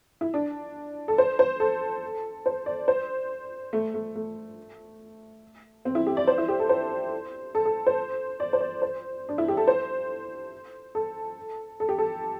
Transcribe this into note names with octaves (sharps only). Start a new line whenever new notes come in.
E4
D4
A4
C5
C5
A4
C5
D5
C5
A3
A3
A3
C4
E4
G4
D5
C5
E4
G4
A4
C5
A4
A4
C5
D5
C5
D5
C5
D4
E4
G4
A4
C5
A4
A4
G4
A4